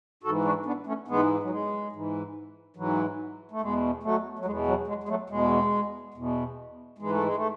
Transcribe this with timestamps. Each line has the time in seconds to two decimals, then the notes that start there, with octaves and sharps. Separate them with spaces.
0.23 G#2 F#4 A4
0.28 E3
0.44 D4 F#4
0.66 B3 D4
0.87 A3 C#4
1.08 G#2 E3 G#3 B3
1.43 F#3
1.50 G#3
1.92 G#2 E3
2.77 G#2 E3 F#3
3.51 A3
3.61 E2 B2 G#3
4.03 F#3 A3
4.39 F#3
4.45 E2 B2 G#3
4.67 F#3
4.87 G#3
5.03 G#3
5.09 F#3 A3
5.30 E2 B2 G#3
6.14 E2 B2
6.98 G#2 E3 G#3
7.11 A3
7.23 G#3
7.35 A3